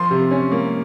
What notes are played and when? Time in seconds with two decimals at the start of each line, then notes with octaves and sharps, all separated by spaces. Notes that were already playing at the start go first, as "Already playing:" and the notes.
Already playing: F3 C6
0.11 C3
0.31 C#4
0.52 A#3